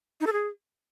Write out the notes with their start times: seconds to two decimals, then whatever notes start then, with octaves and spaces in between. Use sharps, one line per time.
0.21 D#4
0.27 A4
0.33 G#4